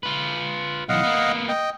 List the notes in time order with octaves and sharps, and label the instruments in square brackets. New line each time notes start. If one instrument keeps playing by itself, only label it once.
[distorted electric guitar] F4 B4
[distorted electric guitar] B1 E3 [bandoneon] D#5 F5 F#5
[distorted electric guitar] A#3 B3
[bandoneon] D#5 G5